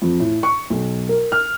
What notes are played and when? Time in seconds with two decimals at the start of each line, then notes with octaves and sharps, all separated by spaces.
0.02 F2
0.20 A2
0.43 C#6
0.70 B1
1.09 A#4
1.32 F6